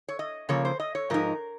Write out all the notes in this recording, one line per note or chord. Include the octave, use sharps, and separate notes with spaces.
C#5
D#5
C#3 F3 A#3 C#5
C5
D#5
C#5
G#2 F3 D#4 A#4